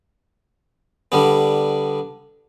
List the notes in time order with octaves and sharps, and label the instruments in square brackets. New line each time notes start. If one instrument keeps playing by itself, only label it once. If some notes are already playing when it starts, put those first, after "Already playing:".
[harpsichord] D3 G3 B3